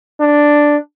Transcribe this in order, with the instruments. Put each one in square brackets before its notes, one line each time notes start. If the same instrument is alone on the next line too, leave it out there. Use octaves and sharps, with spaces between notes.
[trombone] D4